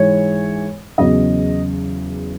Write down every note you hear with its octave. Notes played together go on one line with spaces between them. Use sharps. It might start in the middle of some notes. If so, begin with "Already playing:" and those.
Already playing: G#2 E3 G#3 C#5
E2 C#3 F#3 D#5